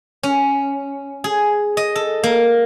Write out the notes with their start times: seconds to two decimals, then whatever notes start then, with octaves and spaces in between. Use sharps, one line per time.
0.23 C#4
1.24 G#4
1.77 D#5
1.96 A4
2.23 A#3